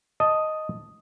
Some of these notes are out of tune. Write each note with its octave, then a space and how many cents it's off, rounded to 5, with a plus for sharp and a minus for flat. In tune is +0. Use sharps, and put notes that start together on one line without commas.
D#5 +0 A5 +0